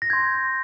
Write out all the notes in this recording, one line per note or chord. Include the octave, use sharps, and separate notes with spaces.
A#6
C6 G6 G#6